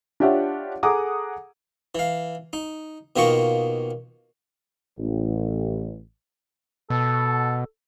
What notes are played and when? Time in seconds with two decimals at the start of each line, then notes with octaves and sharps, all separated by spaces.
0.20 D4 F4 G4 C#5 E5 F#5
0.83 G#4 A4 F#5 A#5 D6 D#6
1.95 E3 F5
2.53 D#4
3.16 B2 D#3 A#3 F4 D#5 C#6
4.98 A1
6.90 B2 A4